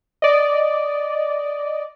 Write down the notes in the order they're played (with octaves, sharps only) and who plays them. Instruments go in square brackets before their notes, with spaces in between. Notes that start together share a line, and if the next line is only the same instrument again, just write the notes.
[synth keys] D5 D#5